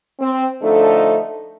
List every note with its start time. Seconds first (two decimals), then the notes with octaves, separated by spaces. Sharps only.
0.20 C4
0.62 D3 F3 A3 D#4 A4